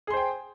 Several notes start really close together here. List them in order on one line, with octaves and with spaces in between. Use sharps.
G#4 C6 C5 G5